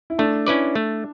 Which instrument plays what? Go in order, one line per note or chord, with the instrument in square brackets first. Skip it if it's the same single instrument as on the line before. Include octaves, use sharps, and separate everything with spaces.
[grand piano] E4
[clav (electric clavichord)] A3 [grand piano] D4
[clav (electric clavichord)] C#4 E4 B4 D5
A3